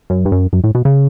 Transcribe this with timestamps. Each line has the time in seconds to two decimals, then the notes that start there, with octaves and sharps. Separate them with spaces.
0.10 F#2
0.25 G2
0.32 F#2
0.53 F#2
0.64 A2
0.75 B2
0.85 C#3